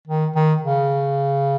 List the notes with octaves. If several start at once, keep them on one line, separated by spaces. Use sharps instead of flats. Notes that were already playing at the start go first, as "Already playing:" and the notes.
D#3
D#3
C#3